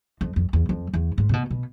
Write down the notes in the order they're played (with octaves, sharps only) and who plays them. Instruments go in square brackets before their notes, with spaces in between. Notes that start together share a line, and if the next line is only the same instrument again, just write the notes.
[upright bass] F2
F2
E2
F2
E2
G#2
C3
B2
B2